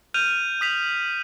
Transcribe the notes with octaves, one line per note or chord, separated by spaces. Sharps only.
F6 G6 D#7 F7
D#6 B6 F7